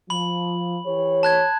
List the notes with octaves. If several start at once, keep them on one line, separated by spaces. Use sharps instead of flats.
F3 B5 F#7
E3 G4 C#5
A5 F#6 G#6